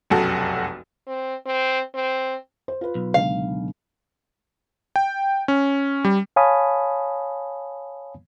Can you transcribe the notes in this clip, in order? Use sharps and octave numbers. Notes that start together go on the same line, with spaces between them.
F1 B1 F#2 F#4 A4
C4
C4
C4
C5
F4 B4
B1
C#2 D3 F5
G5
C#4
G3
C#5 F5 G#5 A5 B5 D#6